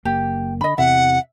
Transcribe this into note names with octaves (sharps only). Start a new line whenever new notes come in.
F#1 A#3 G4
D3 D#5 B5
E2 C3 E3 E5 F#5